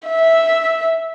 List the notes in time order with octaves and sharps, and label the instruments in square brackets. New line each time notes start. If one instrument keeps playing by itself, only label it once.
[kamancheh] E5